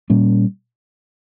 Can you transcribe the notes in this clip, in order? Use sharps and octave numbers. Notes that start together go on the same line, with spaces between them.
A#2 G3 A#3 C#4